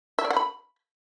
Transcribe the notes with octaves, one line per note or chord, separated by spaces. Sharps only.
E5
D5
F#5
B5